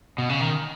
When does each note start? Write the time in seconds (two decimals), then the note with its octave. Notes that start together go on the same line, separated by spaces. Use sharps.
0.18 B2
0.29 C#3
0.40 D#3